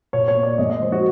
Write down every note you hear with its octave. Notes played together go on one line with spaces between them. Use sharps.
A#2 C#5
C#5
A#3
D5
G#3 D#5
D#5
F3 C5
F#4